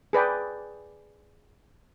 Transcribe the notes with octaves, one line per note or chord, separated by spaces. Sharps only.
G#4 B4 D5 G5